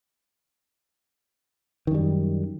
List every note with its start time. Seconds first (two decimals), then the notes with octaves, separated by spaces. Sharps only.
1.87 D#3
1.91 F#2
1.94 G3